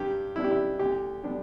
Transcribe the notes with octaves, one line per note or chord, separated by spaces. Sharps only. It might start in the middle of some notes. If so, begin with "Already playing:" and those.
Already playing: G2 G4
G3 B3 D4 E4
G4
E4
D2 G4
D3 G3 B3 D4